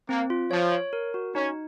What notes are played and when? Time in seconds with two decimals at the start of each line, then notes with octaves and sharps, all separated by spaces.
0.09 A#3 C4
0.30 F4
0.51 F3 C#5
0.72 C#5
0.93 A#4
1.14 F#4
1.35 C#4 D#4